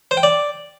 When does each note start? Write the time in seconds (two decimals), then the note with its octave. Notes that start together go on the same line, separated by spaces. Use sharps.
0.11 C5
0.17 G5
0.23 D5